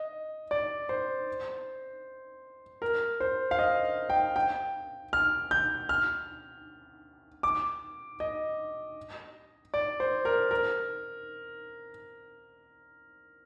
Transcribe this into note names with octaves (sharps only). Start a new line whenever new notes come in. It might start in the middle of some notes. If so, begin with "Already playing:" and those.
Already playing: D#5
D5
C5
A#4
C5
F5
D#5
G5
G5
F6
G6
F6
D6
D#5
D5
C5
A#4
A#4